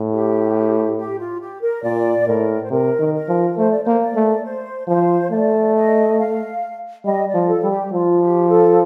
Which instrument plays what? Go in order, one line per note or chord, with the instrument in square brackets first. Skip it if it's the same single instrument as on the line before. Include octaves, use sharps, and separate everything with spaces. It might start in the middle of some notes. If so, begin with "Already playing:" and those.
Already playing: [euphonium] A2
[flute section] G4
G4
F4
G4
A#4
[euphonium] A#2 [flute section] D5
[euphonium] A2 [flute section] A#4
[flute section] C5
[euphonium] C3 [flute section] A#4
[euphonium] D#3
[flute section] A#4
[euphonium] F3
[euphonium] A3 [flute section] C5
[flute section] D5
[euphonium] A#3 [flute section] C5
[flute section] D5
[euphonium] A3
[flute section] C5
[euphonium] F3 [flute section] C5
[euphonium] A3 [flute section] D5
[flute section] D#5
F5
[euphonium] G3 [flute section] D#5
[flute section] D5
[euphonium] F3
[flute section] A4
[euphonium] G3
[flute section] G4
[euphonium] F3 [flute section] F4
[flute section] G4
A4